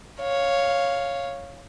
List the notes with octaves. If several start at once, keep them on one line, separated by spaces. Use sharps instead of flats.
C#5 F5